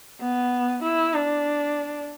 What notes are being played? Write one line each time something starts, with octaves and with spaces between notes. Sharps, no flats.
B3
E4
D4